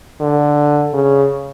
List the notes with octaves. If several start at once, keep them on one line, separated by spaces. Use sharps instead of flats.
D3
C#3